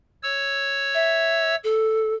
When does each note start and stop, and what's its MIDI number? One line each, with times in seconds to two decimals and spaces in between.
0.23 1.55 73
0.23 1.55 88
0.94 1.56 76
1.64 2.14 69